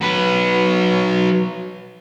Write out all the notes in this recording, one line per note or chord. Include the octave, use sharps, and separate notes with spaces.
F#3 B4